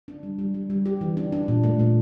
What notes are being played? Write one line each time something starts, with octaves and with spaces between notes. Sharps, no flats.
D4
G3
G3
G3
G3
G4
E3
D4
D4
A#2
A3
A#2